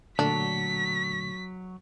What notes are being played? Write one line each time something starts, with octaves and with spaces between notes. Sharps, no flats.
A#2 D3 F#3 A3 D4 B6